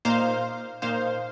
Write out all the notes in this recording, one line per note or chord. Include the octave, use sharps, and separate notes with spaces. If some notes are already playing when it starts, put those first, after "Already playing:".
A#2 A#3 D#4 C5 F5
A#2 A#3 D#4 C5 F5